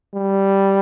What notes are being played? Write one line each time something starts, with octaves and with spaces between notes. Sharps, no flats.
G3